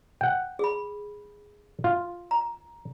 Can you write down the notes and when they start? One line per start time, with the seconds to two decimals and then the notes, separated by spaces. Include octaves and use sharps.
0.21 F#5 G5
0.59 G#4 B5
1.84 F4
2.31 A#5